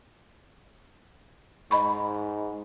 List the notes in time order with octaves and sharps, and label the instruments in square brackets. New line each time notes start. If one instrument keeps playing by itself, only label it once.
[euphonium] G#2 [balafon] D#5 B5 C#6